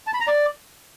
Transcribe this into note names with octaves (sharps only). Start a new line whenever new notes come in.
A5
B5
A#5
D5